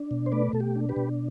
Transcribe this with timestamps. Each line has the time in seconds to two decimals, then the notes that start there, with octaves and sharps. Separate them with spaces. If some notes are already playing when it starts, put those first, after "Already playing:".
Already playing: D4
0.11 B2
0.26 C5
0.32 A3 B4 D5
0.53 B2 A4
0.60 G4
0.76 D4
0.89 G4 B4
0.96 B2